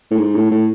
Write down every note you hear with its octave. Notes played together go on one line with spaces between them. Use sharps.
A2
G#2
A2
A2